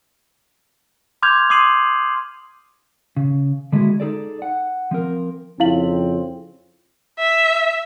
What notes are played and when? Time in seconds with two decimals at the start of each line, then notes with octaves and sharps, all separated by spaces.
1.23 C6 D6 F6 G6 G#6 F7
1.50 C6 D6 D#6 C7 D#7 F#7
3.17 C#3
3.72 D3 G#3 A#3 E4 F#4 G#4
4.00 D#4 G#4 A4 D5
4.42 F#5
4.91 F3 C4 A#4
5.60 F2 C#3 C4 E4 F5 F#7
7.19 E5